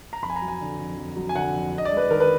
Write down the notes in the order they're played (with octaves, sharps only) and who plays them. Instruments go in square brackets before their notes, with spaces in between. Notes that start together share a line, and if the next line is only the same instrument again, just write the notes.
[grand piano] A#5
F2 B5
G#5
A#5
F#3
G#5
D3
F2
F2
F#3
G#5
D3 F#5
F2
D4
D#5
D5
G#3
B4
D#3 A#4
B4